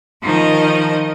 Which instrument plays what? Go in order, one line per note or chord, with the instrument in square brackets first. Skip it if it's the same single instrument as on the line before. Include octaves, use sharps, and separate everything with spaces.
[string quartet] D#3 F3 D#4 D#5